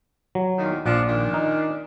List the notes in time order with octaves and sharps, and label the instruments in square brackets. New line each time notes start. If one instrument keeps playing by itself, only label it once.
[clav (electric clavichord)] F#3
[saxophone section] E2 A#2 D#3
[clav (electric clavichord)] A#1 [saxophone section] F3 D4
[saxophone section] A#2 D#3 D4
[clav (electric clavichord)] D#4